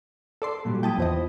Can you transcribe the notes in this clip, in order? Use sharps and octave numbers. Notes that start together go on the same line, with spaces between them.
A4 D5 C6
A#2 F#3 G3
E4 G5 A5 D#6
E2 F3 D#5